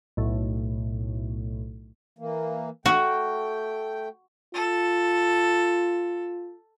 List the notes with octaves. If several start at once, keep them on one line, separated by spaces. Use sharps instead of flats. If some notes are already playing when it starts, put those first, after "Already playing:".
B1 A2
E3 A#3
A3 F#4 G5
F4 A4